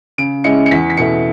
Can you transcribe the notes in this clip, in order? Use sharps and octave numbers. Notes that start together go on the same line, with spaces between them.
C#3 D7
G#3 C#4 E4 C#7
C#7
E2 B6
B6
B2 A3 E4 C#7